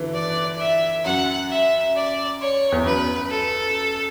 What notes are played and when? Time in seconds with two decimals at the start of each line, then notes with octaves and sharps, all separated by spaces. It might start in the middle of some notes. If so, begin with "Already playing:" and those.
Already playing: D3 E3
0.14 D5
0.60 E5
1.04 F#2 F#5
1.50 E5
1.96 D5
2.41 C#5
2.72 E2
2.85 F#2 B4
3.31 A4